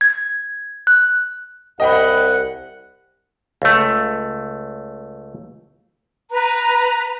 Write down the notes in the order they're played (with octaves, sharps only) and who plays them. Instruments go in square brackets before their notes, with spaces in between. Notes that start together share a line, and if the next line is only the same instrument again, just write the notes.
[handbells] G#6
F#6
[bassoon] C2 [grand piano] D#5 G5 B5 [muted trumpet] F#5
[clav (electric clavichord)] C#2 A3
[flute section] B4 A#5